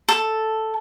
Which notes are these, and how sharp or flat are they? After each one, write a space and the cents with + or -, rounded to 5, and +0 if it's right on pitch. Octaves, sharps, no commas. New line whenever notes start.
A4 +0